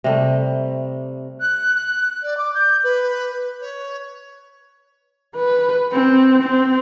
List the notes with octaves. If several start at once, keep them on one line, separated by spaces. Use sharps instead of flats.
C3 G3 A3
F#6
F#6
D5
D6
G6
B4
C#5
B4
C4
C4